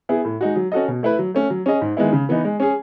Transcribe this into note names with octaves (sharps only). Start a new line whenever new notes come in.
B3 E4 G#4
A2
G#3 D#4 F#4
F#3
C#4 F#4 A4 D#5
B2
A3 E4 B4
F#3
A3 C#4
F#3
C#4 G#4 D#5
G#2
D#3 G#3 B3 E4
C#3
E3 B3 D#4
G#3
C#4 G#4